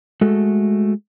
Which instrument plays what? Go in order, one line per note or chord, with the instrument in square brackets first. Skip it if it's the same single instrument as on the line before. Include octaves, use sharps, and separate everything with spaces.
[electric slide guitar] G#3 A3 F#4 A4